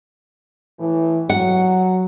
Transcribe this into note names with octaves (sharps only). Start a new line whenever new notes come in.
A2 E3
F#3 F#5